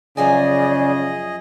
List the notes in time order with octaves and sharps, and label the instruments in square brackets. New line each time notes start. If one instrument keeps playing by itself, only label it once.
[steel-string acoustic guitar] F#2 F3 G#5 [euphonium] C#3 [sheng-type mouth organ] G#4 D#5 [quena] D5